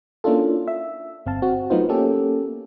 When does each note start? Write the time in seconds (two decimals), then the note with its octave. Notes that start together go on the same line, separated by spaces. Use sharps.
0.24 A#3 C#4 D4 E4 F4 A4
0.68 E5
1.26 G1 C4 F5 A5
1.42 C4 F#4
1.70 F#3 A3 B3 D#4 F4 C5
1.89 A#3 B3 C#4 G4 A4